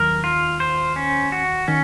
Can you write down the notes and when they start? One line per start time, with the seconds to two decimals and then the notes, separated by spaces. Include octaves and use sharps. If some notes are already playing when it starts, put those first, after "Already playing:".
Already playing: D#2 D#3 F#3 A#4
0.24 F4
0.60 C5
0.96 C#4
1.32 F#4
1.68 D#3 C#4